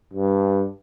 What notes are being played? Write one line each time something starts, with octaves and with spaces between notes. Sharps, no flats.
G2